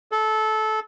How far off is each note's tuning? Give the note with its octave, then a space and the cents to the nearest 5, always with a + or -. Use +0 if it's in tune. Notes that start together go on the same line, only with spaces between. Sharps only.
A4 -20